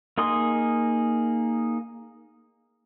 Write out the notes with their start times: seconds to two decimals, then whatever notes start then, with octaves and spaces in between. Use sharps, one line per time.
0.18 A#3 D#4 G#4 C6 D#6